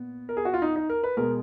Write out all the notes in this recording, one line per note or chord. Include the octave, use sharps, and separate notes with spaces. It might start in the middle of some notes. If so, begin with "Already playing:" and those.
Already playing: A#2 B3
A#4
G#4
F#4
F4
D#4
D#4
A#4
B4
B2 G#3 B3 A#4